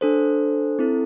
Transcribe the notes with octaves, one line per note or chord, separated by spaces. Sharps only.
D4 A4 C5
C4 E4 A4